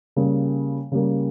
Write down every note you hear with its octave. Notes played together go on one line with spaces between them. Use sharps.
C#3 G3 A#3
C#3 G3 A#3